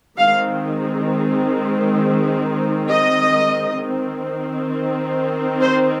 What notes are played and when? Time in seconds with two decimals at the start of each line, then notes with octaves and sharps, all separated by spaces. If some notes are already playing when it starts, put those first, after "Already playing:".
0.17 D#3 G#3 C4 F5
2.89 D#5
3.79 D#3 C4
5.61 C5